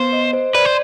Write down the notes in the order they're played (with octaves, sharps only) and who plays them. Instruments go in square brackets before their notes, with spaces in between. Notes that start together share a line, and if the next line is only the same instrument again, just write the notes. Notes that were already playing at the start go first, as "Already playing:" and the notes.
Already playing: [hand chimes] B3 [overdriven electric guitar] C5
[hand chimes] D#5
C5
[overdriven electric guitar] B4 [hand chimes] D5
[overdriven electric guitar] C5